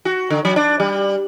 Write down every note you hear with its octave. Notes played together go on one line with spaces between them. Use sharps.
F#4
D3
F#3
D4
G3